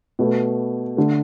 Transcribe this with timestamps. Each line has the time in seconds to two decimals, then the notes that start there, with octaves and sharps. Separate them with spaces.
0.19 B2 A3 B4
0.97 D3 A3